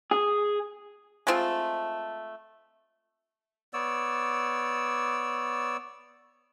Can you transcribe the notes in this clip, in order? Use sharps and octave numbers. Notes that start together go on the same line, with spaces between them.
G#4
G#3 A3 C4 F4
B3 C#5 D5 E6